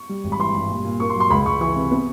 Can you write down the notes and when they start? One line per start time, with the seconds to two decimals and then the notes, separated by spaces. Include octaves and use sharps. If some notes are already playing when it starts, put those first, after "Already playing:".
Already playing: C#6
0.09 G3
0.24 G#1
0.32 B5
0.39 E3 C6
0.55 G2
0.69 A#2
0.85 A#2
1.00 A#3 C#6
1.10 C6
1.15 F#3
1.20 C6
1.30 C#2 B5
1.46 C#2 C#6
1.61 E3 C#6
1.76 C3
1.91 B3